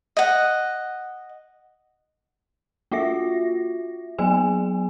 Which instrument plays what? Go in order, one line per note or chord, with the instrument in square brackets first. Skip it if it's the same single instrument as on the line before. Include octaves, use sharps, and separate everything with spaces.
[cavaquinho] D#5 F#5
[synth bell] A#3 F4 F#4 E5 A#6
F#3 B3 G#4 G#5